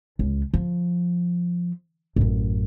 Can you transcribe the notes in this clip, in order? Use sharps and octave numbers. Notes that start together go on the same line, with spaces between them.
C#2
F3
A1 F#2